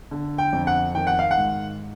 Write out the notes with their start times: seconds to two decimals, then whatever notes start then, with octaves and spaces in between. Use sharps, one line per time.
0.11 D3
0.38 G5
0.53 F2
0.67 F#5
0.95 D#3 G5
1.07 F#5
1.19 F5
1.31 F#5
1.37 G#2